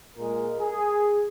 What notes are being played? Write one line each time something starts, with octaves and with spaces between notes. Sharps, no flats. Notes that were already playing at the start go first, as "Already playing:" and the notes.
A#2 G#3 A#4
G#4